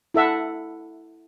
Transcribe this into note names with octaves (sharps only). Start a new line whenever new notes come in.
E4 A4 E5 F#5